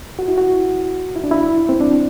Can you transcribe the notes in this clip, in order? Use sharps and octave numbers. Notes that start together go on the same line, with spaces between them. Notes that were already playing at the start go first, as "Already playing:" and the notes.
F#4
E4
F#4
E4
D4
E4
C4
D4